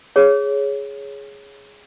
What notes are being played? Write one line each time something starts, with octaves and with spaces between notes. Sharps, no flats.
G#4 C#5